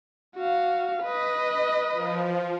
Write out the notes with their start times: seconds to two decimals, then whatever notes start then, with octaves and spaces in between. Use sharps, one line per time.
0.36 F#4 F5
1.04 B4 D#5
1.92 F3